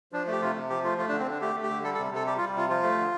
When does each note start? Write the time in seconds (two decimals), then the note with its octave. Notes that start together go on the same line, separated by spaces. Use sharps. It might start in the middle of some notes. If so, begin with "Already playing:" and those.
0.12 F3 D4
0.27 A3
0.32 G4
0.41 C3 F4
0.56 C3
0.70 F3 G4
0.84 A3 F4
0.98 A3 F4
1.09 D4
1.12 D3
1.20 C4
1.26 D3 D4
1.41 A3 G4
1.55 A3
1.63 G4
1.70 D3
1.84 G3 A4
1.95 A4
1.98 C3
2.12 C3 A4
2.26 G3 G4
2.37 F4
2.41 G3
2.56 C3 F4
2.69 F3 F4
2.83 A3
2.98 D3